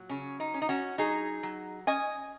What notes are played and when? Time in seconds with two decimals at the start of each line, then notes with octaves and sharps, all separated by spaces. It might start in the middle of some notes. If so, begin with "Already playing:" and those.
Already playing: A#2 F#3
0.09 C#3 C#4
0.40 D#4
0.54 C#4
0.62 D#4
0.69 C#4 F#4
0.98 F#3 D#4 G#4
1.43 F#3
1.87 C#4 D#5 G#5